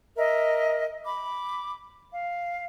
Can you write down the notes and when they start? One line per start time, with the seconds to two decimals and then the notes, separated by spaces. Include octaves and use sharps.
0.17 A#4 D#5 E5
1.05 B5 D6
2.13 F5